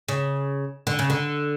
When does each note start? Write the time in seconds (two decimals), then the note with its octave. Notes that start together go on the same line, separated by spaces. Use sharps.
0.08 C#3
0.87 D3
0.99 C#3
1.10 D3